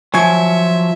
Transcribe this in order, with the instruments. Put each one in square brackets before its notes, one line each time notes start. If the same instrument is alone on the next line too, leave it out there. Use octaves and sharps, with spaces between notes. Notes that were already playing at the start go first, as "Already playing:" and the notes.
[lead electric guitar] F3 F#3 [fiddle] E5 [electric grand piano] G#5 C#6 G#6